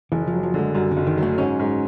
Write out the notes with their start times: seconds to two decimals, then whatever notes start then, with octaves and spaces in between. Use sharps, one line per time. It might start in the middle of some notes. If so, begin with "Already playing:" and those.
0.12 F#1 E3
0.27 F3
0.33 F#3
0.43 F3
0.54 D3 G#3
0.74 F#2 G3
0.91 D3
0.97 F#1
1.07 D#3
1.17 F#3
1.23 A3
1.38 G#2 C#4
1.60 G#2